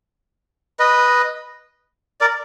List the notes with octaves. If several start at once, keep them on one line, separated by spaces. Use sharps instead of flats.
B4 D#5
A#4 D5